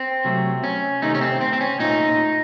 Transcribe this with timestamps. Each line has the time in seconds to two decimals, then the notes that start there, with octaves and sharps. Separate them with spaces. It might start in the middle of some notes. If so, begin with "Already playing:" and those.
Already playing: C4
0.25 C3 F#3 A3
0.64 C#4
1.02 C3 D#3 A3 D#4
1.15 C#4
1.21 C4
1.41 C4
1.53 C4
1.61 C#4
1.80 A#2 A3 D#4